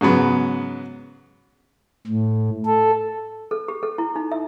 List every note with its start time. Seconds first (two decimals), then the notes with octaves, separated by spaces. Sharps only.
0.01 G#2 C#3 F#3 B3
2.07 A2
2.65 A4
3.51 A4
3.68 G4
3.83 A4
3.98 E4
4.16 D#4
4.32 E5